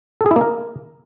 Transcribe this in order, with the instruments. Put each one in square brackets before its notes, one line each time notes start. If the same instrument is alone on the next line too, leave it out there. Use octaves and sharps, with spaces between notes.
[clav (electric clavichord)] A4
G#4
E4
A#3
A#4